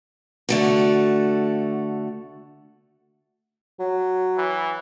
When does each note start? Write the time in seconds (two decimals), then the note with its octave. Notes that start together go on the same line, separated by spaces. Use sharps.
0.49 D3 A3 F#4
3.80 F#3
4.38 E3